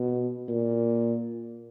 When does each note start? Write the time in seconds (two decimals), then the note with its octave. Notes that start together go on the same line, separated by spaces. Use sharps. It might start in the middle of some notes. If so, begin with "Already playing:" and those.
Already playing: B2
0.48 A#2